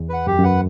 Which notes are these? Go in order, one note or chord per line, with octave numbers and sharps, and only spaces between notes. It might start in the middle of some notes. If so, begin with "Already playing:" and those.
Already playing: E2
B4 F#5
F#2 G4
F#2
B4 F#5